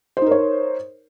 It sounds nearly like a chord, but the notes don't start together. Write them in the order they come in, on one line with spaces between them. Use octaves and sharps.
C5 D#4 A#4 C#5